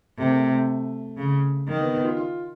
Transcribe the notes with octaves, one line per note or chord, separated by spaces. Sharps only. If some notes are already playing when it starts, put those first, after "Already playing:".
C3 A3
A#3
A3
A3
C#3
D#3 A#3
B3
B3
F4
F4